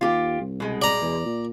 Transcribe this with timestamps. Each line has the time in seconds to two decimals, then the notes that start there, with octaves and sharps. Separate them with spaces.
0.01 D#2 F4 G4
0.40 C2
0.60 B2 G#3
0.82 D5 A#5
1.02 E2
1.26 A#2